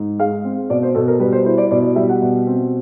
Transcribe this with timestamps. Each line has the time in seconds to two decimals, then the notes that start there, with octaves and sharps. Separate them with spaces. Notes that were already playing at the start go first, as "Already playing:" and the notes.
Already playing: G#2
0.19 G#3 F5
0.44 C4
0.70 B2 D5
0.83 C5
0.95 B2 A4
1.08 A#4
1.20 G3 B4
1.32 C5
1.45 E4 C5
1.58 D5
1.71 B2 D5
1.83 D5
1.96 G3 E5
2.09 F#5
2.21 B2
2.47 C4